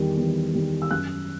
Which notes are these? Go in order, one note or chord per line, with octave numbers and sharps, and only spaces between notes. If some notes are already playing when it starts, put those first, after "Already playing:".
Already playing: E2 D#3 G3
E2
D#3 G3
E6
F#2 F#6